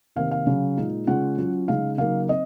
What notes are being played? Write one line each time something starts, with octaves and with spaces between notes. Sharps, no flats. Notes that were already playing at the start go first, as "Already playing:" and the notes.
C3 D#3 A#3 F5
F5
C#3 F#3 C#4
A#2 G#3 D#4
C#3 G#3 C#4 F4 F#5
F#3 C#4 F4
C#3 G#3 D#4 F5
C#3 F#3 A#3 D#4 F5
C4 D#5